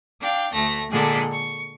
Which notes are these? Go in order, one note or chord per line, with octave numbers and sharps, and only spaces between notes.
D4 F5 G5
D2 A3 A#6
A#2 D3 G#3 G#4 A4
C#6